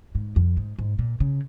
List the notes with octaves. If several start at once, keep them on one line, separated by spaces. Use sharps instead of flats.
G#2
F2
G#2
G#2
A#2
C#3